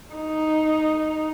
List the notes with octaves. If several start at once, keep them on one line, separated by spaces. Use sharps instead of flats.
D#4